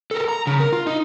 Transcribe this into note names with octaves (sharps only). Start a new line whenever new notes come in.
A4 A#4
A#5
C#3
A#4
F4
D#4